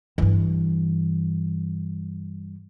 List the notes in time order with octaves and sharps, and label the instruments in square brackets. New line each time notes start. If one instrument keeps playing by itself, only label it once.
[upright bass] G2 E3